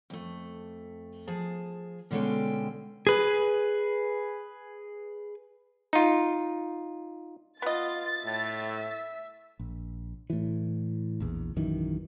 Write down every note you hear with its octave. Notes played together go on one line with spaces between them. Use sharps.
F2 A3
F3 G#4 A5
B2 D3 G#3 C#4 A4 G5
G#4 B4
D#4 F4
B3 F4 D#5 A6
A2 E5
A#1
A2 E3
A#1 E2
A#1 F#2 D#3 E3